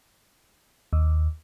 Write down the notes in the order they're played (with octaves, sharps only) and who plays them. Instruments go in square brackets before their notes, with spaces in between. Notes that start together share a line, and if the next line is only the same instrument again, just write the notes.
[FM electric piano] D#2